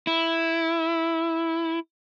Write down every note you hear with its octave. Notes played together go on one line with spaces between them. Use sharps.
E4